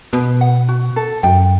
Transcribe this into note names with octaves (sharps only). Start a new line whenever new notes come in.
B2 B4
F#5
F#4
A4
F#2 G5